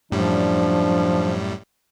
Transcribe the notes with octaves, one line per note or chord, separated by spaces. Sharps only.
F#2 A2 F3 G3 D4